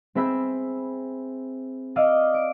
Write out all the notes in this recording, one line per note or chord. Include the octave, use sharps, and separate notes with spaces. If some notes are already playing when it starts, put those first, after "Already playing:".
C4 G#4 E5 B5 E6 G6
D5 D#5 F5 E6
D7